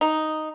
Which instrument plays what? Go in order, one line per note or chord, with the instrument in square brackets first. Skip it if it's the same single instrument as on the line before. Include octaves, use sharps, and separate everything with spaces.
[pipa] D#4